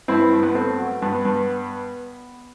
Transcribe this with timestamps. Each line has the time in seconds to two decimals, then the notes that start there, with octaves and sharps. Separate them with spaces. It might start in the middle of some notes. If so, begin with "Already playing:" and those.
0.08 G2 C4 E4
0.33 G2
0.43 B3
0.55 A3 C4
0.78 F#3
1.02 G2 B3
1.25 G2